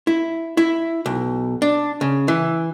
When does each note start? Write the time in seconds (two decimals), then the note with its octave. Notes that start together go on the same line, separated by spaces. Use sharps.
0.07 E4
0.57 E4
1.06 B1
1.62 D4
2.01 C#3
2.28 E3